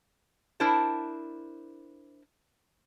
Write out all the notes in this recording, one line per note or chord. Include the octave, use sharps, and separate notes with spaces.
D4 E4 A#4 C5 A5